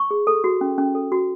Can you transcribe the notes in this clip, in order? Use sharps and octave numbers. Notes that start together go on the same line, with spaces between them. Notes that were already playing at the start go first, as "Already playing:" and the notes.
Already playing: C#6
G#4
A4
F#4
C#4
C#4
A4
F#4